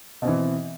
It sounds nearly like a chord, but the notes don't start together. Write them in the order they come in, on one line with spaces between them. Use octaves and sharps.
B2 C4 E3